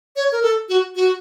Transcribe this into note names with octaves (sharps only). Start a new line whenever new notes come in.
C#5
A#4
A4
F#4
F#4